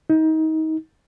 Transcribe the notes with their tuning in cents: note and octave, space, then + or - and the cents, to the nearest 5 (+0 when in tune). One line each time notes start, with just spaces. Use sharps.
D#4 +30